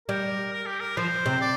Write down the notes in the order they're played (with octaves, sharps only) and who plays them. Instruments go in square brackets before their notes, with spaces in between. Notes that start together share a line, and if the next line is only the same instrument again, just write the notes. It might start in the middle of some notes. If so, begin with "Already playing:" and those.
[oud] G3 [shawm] A#4
[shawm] A#4
G4
A#4
[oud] F3 [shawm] C5
[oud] C3
[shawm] D5